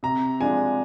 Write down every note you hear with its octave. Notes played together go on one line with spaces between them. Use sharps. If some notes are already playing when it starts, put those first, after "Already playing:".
C3 A#5
F3 G#3 D4 G#5